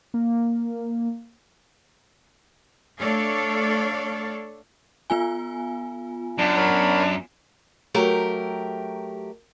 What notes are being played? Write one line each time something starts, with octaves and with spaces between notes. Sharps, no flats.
A#3
A3 D4 A4 C#5 D5 F5
B3 F4 G#5
F#2 D4
A#4 C#5 B5
F#3 A3 G4 A#4